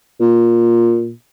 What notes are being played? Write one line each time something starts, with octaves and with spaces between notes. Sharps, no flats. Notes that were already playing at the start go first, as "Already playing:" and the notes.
A#2